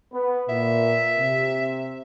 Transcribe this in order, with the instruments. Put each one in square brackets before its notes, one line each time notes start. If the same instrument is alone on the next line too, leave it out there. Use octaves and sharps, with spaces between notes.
[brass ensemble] B3 B4
[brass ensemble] A#2 [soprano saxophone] E5
[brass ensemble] C3